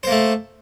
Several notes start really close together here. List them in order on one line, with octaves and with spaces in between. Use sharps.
C5 A#3 A3